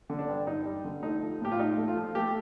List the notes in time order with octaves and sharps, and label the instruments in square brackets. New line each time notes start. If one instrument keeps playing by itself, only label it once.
[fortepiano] D3
D4
G2
G2 D#4
G3
D3
A3 D#4
F3
A2 G4
F4
A2 D#4
A3
F4
F3
A3 G4